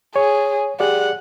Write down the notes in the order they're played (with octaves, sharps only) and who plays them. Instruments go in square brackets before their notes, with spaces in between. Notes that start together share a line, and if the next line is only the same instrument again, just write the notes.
[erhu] G#4 [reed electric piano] C#5
[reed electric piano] G4 G#4 D5 [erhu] F#5